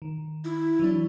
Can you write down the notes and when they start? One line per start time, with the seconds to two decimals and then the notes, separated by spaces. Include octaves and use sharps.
0.02 D#3
0.45 E4
0.79 E3 F#3 D4